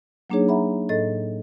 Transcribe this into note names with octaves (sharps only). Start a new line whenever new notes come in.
F#3 A#3 D4 D#4 G#4 C#5
E5 F#5 A#5 B5
A2 A4 D#5 A6